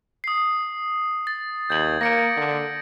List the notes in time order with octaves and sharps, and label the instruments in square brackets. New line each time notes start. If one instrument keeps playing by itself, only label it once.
[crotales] D#6 C7
A6
[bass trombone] D#2 [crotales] G6 G#6 F#7
[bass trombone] A#3 [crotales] A#6 C#7 D7
[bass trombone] D3